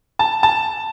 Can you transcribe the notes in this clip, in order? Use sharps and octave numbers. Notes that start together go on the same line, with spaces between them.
A5
A5